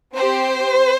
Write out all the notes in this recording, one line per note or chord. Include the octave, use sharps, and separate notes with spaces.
C4 G4 C5